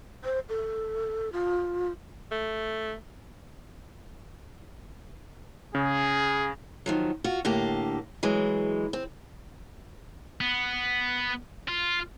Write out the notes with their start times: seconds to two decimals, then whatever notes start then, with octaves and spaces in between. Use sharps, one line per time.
0.24 C5
0.49 A4
1.32 F4
2.32 A3
5.75 C#3 G#4
6.86 D#3 F3 F#3
7.24 F4 F#4
7.45 A2 D3 A#3 G4
8.23 E3 F#3 G#3
8.93 C4
10.41 B3
11.68 F4